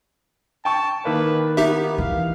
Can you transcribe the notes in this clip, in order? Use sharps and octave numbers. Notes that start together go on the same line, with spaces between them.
G5 A5 C#6
D#3 A#3 B4
B3 D#4 G4 E5
E3 F5